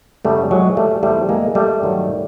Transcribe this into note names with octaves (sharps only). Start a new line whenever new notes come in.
F#2 C#3 F#3 G3 A3
F#3 G#3
G3 A3
E2 C3 E3 G3 A3
G#3 A#3
G3 A3
G2 D#3 F#3